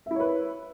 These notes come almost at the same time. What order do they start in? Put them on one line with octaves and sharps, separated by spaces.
E5 E4 C#5 B4